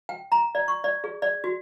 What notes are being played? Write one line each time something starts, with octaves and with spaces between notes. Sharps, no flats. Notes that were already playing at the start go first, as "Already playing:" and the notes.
G5
A#5
D5
C#6
D5
G#4
D5
F#4